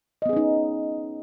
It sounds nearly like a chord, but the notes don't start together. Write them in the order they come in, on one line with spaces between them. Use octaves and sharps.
D#5 B3 G#4 C#4 D#4